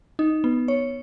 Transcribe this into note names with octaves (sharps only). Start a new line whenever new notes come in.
D#4
B3
C#5